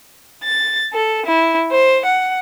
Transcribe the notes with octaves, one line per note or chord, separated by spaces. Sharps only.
A6
A4
E4
C5
F#5